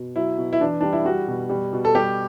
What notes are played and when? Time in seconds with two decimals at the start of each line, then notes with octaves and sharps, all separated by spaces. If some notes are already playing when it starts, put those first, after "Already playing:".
Already playing: B2
0.16 F#3 E4
0.38 B2
0.53 E4
0.60 E3 D4
0.81 G3 D4
0.93 E4
1.05 G3 F#4
1.28 B2
1.49 G3
1.73 B2
1.85 A4
1.95 G3 G4